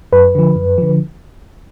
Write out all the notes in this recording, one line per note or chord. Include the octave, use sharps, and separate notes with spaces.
F#2 B4
D3 F3
F#2
D3 F3